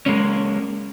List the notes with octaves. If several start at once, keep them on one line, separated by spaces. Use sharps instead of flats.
G#3 A#3 C#4